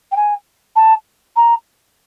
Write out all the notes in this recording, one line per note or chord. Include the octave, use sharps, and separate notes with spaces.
G5
G#5
A5
A#5